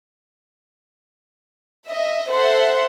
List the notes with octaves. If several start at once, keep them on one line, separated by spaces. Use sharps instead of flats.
D#5 E5
A4 C5 E5 F#5 C6